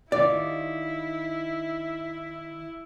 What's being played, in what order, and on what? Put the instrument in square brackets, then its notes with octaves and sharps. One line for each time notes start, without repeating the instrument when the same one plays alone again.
[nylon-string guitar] D#3 F4 G4 [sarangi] E4 [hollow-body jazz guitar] D5